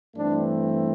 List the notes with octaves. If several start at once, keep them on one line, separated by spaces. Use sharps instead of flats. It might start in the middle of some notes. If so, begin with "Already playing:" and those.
G2 E3 A3 C4 D4